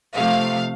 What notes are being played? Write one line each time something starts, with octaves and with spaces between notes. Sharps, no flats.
C3 F3 A3 F5